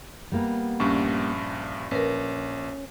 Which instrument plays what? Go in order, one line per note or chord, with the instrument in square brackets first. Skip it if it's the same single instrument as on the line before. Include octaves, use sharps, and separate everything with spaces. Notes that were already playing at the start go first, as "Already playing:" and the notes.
[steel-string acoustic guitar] G3 A#3 B3
[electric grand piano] A#1 G2 [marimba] C#4
[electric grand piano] A#1 [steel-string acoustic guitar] C#4 [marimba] A#4 B4